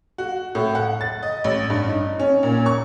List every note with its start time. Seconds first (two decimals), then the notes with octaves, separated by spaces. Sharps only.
0.18 F#4
0.55 A2
0.75 F#5
1.01 A6
1.23 D#5
1.44 A1
1.70 G2
1.88 D#4
2.20 C#4
2.43 A#2
2.66 C#6